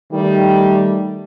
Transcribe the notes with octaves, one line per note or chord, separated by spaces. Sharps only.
D#3 G3 A3